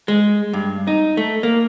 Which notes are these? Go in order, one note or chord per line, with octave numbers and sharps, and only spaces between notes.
G#3
G2
D#4
A3
A#3